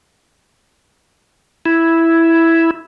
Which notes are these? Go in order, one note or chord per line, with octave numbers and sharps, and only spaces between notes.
E4